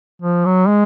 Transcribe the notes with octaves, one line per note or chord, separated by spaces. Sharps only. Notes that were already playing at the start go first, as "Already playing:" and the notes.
F3
F#3
G#3